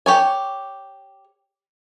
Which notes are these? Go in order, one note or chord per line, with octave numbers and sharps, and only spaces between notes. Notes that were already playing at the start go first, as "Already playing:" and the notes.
G4 C#5 G#5